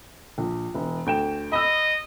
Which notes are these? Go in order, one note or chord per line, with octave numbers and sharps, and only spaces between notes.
A#1
E1
D2 G5 E7
D#5 B5 E6